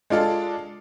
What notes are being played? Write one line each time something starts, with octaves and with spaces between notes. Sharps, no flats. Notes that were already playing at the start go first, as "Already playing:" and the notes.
G#3 D4 F4 A4